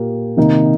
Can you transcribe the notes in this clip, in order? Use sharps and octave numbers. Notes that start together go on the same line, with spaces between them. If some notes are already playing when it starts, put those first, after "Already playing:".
Already playing: A#2 A#3 G4 A#4
C3 D#3 A#3 D#4